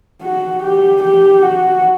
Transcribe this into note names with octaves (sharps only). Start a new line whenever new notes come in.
F#4
G4
G4
F#4